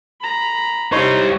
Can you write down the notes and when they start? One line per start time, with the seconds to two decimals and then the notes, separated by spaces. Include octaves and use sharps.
0.21 A#5 B5
0.92 G3 D#4 C5 C#5